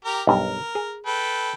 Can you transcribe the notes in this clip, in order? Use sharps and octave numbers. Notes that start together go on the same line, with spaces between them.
G4 A#4 A#5
B1 G2 A#4
G#4
A4 B4 G5